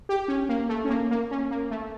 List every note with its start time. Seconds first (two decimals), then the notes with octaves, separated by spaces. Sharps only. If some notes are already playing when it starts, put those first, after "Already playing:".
0.09 G4
0.28 C#4
0.49 A#3
0.69 A3
0.84 C#4
0.89 A#3
1.11 A#3
1.31 C#4
1.51 A#3
1.71 A3